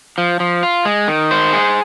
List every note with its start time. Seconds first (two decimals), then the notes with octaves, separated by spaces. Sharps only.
0.18 F3
0.40 F3
0.63 F4
0.85 G#3
1.08 D#3
1.31 C5
1.53 G#4